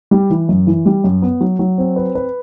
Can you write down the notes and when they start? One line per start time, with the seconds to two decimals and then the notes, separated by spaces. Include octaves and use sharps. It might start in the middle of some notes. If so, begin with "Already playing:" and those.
0.11 G3
0.30 E3
0.49 F#2
0.67 E3
0.86 G3
1.04 F#2
1.22 B3
1.41 F#3
1.59 F#3
1.78 C4
1.96 B4
2.15 B4